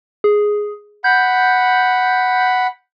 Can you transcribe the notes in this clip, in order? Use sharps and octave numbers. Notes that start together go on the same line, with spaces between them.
G#4
F#5 B5 G6